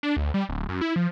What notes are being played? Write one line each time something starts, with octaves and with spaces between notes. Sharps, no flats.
D4
D2
G3
D1
F#2
E4
F3